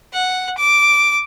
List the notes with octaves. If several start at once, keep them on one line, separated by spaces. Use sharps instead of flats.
F#5
D6